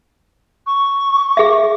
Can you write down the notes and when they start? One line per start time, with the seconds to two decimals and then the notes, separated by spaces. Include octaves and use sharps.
0.67 C#6
1.37 G#4 E5